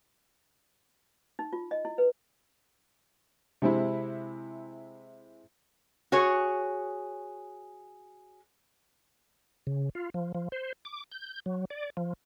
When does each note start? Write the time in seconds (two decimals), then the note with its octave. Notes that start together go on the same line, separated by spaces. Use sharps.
1.39 D#4
1.53 F4
1.71 D#5
1.85 E4
1.98 B4
3.62 C3 G#3 C4 E4
6.12 F#4 G#4 C#5
9.67 C#3
9.95 F4
10.14 F3
10.35 F3
10.52 C5
10.85 D6
11.12 G6
11.46 F#3
11.70 D5
11.97 F3